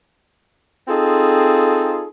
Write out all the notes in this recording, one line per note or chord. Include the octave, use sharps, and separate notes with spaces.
C4 D#4 F4 G#4 A4